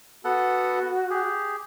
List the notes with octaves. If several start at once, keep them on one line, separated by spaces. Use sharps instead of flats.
B3 F#4 A4 F#5
G4 G#4